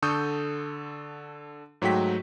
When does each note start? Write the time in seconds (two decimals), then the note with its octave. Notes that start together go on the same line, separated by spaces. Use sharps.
0.02 D3 A4 C#6 D#6 G6
1.82 G#2 F#3 A3 F#4 G5 B6